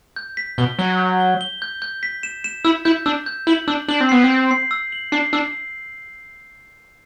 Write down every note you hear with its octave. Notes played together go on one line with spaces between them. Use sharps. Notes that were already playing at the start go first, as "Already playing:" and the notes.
G6
B6
B2 G7
F#3 G7
G6
G7
G7
G6
G6
B6
E7
E7
E4 E6
E4 G6
D4 E6
G6
E4 F#7
D4 E6
D4 F#7
C4
B3 C7
C4
G6
C7
E6
F#7
D4 C7
D4 E6